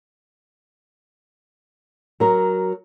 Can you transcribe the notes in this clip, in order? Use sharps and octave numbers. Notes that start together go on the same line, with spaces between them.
F#3 A#4